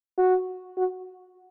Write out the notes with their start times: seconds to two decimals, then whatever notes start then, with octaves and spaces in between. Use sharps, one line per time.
0.18 F#4
0.77 F#4